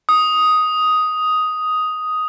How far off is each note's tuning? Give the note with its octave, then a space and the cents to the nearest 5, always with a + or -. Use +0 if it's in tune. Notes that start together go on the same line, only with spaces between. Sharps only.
D#6 +5